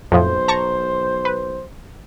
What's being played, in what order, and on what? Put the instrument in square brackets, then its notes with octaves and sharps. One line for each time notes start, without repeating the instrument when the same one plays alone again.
[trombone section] B1 C5 [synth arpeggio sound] F2 A2 F3
[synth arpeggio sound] A5 A#5 C#6
B4